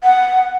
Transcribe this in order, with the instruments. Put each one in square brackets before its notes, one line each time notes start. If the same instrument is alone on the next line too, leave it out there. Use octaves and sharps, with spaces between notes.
[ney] F#5